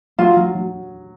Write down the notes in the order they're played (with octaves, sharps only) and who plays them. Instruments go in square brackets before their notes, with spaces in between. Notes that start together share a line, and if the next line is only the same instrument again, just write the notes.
[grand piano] F#3 [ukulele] F4
[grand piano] F#3
F#3